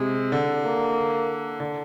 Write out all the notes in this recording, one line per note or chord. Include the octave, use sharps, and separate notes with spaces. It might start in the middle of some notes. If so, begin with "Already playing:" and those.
Already playing: C3 G#3
D3
A#3
D3